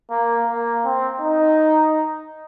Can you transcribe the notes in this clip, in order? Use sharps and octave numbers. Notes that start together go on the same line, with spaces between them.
A#3
A#3
C4
D#4